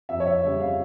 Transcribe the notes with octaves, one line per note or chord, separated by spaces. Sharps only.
F2 E5
C#5
E5
C#3 G3 C#4
F5